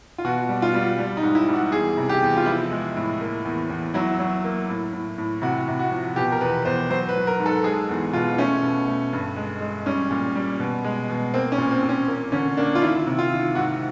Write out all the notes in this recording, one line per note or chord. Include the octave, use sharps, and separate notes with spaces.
F4
B2 F#4
G3
F4
G3
G3
D#4
G#2
E4
G3
F#4
E2 G#4
C3
G4
E2
F4
F3 E4
G#3
A2
A#3
E2
E2
F#3 E4
F#3
A#3
A2
A2
A2
C3 F#4
C3
F#4
F3
B2 G4
A#4
E2 B4
E2 C5
F#3 C5
B4
F#3
A#4
G#2
A4
G#3 G#4
E2
B2 F4
A3 C#4
B2
A3
G2
G#3
G#3
G3 C#4
A#2
G3
B2
G#3
B2
A#3 C4
C#4
A#2
C4
A#2
C#4
A#3
D3 C#4
A#3 D4
F4
D#3 E4
C3
F4
D#3
G#2 F#4